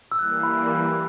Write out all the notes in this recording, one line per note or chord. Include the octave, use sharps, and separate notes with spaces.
E6
E3 G3 A#3 F#6
B5